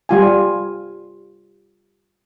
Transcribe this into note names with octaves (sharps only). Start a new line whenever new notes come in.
G3 F4 G#5